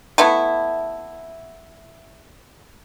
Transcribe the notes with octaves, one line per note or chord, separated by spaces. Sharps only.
A3 B3 E4